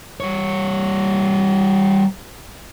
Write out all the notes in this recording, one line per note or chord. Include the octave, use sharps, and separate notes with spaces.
G3 C#5